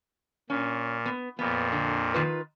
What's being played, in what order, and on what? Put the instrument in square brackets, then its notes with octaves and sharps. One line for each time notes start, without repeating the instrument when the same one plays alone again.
[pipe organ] A#2 [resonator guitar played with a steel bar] C#4
[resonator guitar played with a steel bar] B3
[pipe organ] F2 A#2 [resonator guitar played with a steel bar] B3
[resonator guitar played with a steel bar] D3
D#3 F4 B4